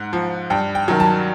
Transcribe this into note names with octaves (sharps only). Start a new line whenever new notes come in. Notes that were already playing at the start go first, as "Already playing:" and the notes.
Already playing: G#2 F#5
F3
G2 G5
G5
D#3 F#3
A5